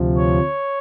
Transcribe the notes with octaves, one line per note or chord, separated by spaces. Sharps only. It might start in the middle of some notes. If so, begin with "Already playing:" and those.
Already playing: D2 C3 F3
C#5